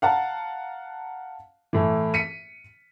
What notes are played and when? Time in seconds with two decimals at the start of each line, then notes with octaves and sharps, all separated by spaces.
0.02 F5 F#5 A5 A#5
1.73 A2 E3
2.14 B6 C#7 D#7